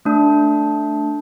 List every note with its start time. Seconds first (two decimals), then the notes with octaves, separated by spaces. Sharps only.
0.05 A3 D4